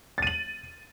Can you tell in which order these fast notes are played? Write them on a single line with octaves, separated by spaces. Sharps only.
A6 D#7 F#7